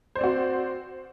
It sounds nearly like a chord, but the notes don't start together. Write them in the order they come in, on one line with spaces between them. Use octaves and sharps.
C5 D5 C4 F#4